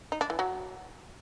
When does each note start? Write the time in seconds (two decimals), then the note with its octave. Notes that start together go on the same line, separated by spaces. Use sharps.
0.12 D#4
0.21 D4
0.30 E3
0.39 F#3